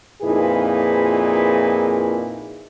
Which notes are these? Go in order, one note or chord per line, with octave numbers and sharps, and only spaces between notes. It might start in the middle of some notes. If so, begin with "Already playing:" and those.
F2 A#2 D#4 E4 G#4 B4